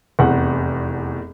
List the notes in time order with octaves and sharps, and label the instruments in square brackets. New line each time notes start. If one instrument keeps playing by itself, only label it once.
[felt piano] F1 E2 F#5